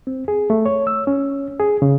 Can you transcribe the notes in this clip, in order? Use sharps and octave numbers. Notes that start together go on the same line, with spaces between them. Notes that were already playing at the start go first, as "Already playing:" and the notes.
C4
G#4
A3
C#5
E6
C#4
G#4
C#3